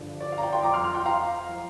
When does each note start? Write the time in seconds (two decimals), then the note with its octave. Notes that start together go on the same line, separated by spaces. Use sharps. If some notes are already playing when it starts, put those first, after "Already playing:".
Already playing: G2 D3 F3
0.20 D5
0.32 F5
0.38 A#5
0.42 D5 G5
0.53 G5 C6
0.63 F2 F3 A#5 D6
0.74 C6 F6
0.84 C6 F6
0.95 G5 C6
1.06 F5 A#5
1.49 F3